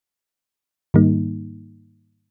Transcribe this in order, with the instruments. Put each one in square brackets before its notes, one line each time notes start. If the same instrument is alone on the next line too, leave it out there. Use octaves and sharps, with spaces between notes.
[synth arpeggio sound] G#2 D#3 G3 A#3 D#4